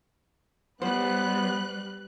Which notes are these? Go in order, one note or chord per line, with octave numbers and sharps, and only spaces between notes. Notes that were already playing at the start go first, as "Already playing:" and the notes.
G3 B3 B4 C5 F#6